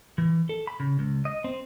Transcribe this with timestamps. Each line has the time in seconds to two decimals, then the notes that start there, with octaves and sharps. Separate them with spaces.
0.18 E3
0.49 A4
0.67 B5
0.80 C#3
0.99 C#2
1.25 D#5
1.44 C4